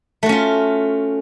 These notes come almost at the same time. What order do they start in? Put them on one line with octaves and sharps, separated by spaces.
A3 F#4 C#4 F4